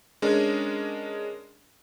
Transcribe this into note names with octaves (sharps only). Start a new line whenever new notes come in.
G#3 C#4 D4 G#4 A#4